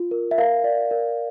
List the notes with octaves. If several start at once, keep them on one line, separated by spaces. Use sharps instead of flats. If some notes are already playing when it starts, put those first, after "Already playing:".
Already playing: F4
A#4
E5
A#4 F5
D5
A#4